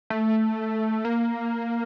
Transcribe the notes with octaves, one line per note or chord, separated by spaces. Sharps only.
A3
A#3